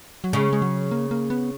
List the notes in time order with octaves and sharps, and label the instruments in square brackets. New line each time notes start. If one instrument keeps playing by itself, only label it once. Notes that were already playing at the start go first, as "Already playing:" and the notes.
[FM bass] F#3
[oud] C#3 [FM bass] G#3
[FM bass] G#3
F#3
A#3
A#3
B3